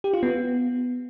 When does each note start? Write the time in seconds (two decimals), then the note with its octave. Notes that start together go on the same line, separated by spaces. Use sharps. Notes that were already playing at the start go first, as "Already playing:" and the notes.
0.04 G4
0.13 F4
0.23 B3